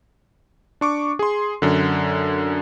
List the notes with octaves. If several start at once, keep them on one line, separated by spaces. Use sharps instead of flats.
D4 C#6 D6
G#4 C6
F#2 D3